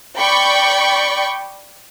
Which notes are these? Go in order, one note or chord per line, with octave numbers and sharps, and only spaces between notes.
D5 G5 B5 C#6